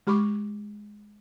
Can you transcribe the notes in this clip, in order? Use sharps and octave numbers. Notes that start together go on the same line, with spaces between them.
G#3 G4 B5 C#6 D6